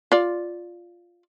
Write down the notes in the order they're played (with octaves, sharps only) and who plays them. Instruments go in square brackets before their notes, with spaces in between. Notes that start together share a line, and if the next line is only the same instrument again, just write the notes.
[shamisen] F4 D5